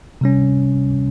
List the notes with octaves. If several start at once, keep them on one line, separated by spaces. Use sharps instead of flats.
C3 G3 C#4